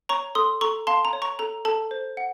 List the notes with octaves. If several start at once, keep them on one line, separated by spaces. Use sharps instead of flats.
C#5 A#5 C#6
A4 C6 D#6
A4 A#5 C#6
F5 A5 C6
A#5
C#5
A#5 C#6
A4 A#5
A4 A5
C5
F#5